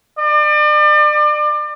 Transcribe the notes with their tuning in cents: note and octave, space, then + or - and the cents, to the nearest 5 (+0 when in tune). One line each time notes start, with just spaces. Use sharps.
D5 +35